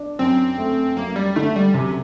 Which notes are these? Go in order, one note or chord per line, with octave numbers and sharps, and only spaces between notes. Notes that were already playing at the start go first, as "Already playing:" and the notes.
Already playing: D4
F#2 C4
A3
F#2 A#3
G3
D3 A3
G3
F#2 C3